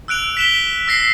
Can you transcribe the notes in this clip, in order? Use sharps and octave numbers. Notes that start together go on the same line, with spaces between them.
E6 F#6 D7 F7
B6 E7 G7
E6 A#6 C7